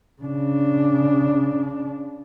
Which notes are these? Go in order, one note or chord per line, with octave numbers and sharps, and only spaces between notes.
C#3 D4